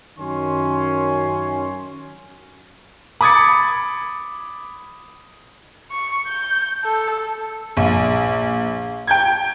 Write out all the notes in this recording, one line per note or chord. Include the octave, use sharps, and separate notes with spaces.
F#2 D#3 C#4 C6
B5 D6 D#6 G#6 A6 C#7
C#6
G6
A4
A#1
G5 G6 G#6